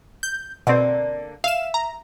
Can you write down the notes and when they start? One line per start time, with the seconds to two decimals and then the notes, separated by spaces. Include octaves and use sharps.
0.23 G6
0.67 B2 D3 A#3 C4
1.44 E5 F5 E7
1.74 A#5